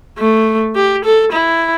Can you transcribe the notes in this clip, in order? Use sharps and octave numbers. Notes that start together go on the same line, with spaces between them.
A3
G4
A4
E4